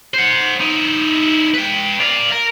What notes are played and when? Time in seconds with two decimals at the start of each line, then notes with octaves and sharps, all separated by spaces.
0.14 C5 F#5
0.60 D#4 E4
1.54 B4 G5
2.00 D5 F5
2.32 A#4